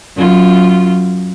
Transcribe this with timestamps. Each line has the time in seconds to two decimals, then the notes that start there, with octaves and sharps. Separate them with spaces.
0.16 F#2 F4